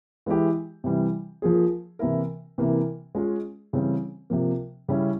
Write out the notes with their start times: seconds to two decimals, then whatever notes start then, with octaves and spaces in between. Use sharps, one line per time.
0.26 E3 G#3 E4 G4
0.84 C3 E3 G3
1.42 F3 A#3 F4 G#4
1.99 C3 E3 A#3 E4 A#4
2.58 C3 E3 A#3
3.15 G#3 C#4 F4 G#4
3.73 C#3 E3 G3 C4
4.30 C3 F3 A#3
4.89 C#3 G3 C#4 E4